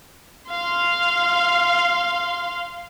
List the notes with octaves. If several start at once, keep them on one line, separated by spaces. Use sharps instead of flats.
F5 C6